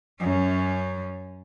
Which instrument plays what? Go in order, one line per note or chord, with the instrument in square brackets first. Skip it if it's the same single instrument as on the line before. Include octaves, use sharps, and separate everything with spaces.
[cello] F#2 C#4